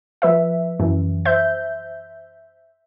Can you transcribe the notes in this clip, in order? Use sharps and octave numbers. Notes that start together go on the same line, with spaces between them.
F3 B4 E5
F#2 E3
C5 E5 G6